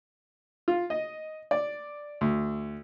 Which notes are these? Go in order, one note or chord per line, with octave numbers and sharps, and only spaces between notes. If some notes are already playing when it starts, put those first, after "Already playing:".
F4
D#5
D5
D2